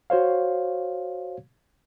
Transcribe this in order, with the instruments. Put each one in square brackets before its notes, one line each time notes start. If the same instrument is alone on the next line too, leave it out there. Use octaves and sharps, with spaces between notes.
[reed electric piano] F#4 C5 C#5 F5